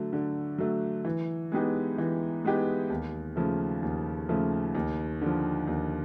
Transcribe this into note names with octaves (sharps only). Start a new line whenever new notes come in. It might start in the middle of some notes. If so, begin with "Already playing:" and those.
Already playing: D3 F#3 A3
D3
F#3 A3
E3
G#3 B3 D#4 G4
E3
G#3 B3 D#4 G4
D#2
C#3 F3 A3
D#2
C#3 F3 A3
D#2
D3 F3
D#2